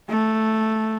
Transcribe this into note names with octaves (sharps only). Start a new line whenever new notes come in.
A3